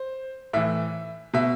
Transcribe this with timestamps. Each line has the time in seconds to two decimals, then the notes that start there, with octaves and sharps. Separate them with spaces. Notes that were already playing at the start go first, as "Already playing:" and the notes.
Already playing: C5
0.53 A2 E3 E5
1.34 B2 E5